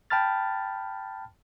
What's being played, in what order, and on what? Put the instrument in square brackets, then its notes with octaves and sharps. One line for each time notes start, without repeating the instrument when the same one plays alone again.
[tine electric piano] G5 A5 B5 F6 A6